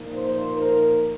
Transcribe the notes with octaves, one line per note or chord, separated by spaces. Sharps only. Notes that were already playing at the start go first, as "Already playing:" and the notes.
Already playing: A#2 F3 A#3 D#4
C5
A#4